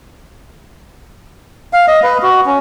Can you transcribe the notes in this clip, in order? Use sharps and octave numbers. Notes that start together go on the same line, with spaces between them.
F5
D#5
B4
F#4
C#4